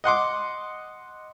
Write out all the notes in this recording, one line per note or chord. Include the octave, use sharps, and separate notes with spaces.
D#5 F#5 C6 D6